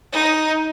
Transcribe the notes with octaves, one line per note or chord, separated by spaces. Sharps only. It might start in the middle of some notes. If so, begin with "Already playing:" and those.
D#4